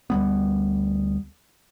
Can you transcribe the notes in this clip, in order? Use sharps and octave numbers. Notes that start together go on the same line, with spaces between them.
D2 G3 B3